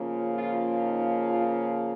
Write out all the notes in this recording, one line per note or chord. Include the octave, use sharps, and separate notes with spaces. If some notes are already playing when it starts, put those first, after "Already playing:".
Already playing: C#3 F3 A#3
F4
D#4
F4